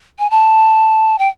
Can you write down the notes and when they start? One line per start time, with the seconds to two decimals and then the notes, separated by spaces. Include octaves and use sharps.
0.19 G#5
0.31 A5
1.19 G5